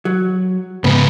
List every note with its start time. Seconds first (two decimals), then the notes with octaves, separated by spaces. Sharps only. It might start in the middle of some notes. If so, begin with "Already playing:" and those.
0.05 F#3
0.84 G#2 C#3 B3